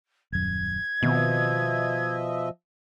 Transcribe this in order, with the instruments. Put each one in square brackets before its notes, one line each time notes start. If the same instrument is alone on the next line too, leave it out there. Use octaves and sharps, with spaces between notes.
[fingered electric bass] D#1 F#2 [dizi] G#6
[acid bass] B2 [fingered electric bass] D#3 B3 C4 [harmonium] F3 D#5 E5